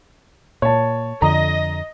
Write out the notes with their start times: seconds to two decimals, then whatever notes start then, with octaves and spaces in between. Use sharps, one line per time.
0.62 A#2 C#5 A5
1.22 F2 D3 D#5 A#5